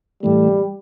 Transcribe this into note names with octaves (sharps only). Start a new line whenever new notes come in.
A2 E3 G3 A3